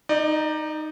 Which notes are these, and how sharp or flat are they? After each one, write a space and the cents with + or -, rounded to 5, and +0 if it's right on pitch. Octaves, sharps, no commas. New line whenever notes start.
D#4 +0 D5 +30